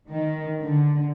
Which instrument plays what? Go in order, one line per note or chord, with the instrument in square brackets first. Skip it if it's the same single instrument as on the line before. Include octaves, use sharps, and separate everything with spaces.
[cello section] D#3
D3